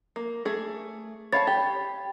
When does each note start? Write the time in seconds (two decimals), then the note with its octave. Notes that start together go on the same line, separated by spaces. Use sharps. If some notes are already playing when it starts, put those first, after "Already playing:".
0.16 A#3
0.45 A3 G#4
1.32 C#5 F5 A5 B5 A6
1.47 G4